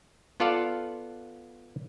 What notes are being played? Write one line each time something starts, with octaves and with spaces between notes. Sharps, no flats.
B3 F4 A4 D5 F5 F#5